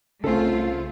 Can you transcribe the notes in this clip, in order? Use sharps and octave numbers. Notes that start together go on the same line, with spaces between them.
C2 C#3 A3 C4 F4 A4